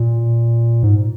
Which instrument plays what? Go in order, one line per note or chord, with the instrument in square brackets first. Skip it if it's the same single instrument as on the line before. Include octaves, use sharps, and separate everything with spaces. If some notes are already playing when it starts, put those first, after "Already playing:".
Already playing: [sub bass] A#2
G#2